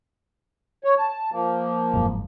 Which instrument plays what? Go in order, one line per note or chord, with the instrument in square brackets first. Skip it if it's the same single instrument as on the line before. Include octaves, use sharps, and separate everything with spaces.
[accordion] C#5
A5
F3 A#3
[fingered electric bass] F#1 F2 G#2